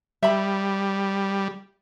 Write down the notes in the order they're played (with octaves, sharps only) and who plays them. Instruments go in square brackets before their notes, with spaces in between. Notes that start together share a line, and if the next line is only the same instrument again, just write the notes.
[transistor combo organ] G3 [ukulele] E5 B5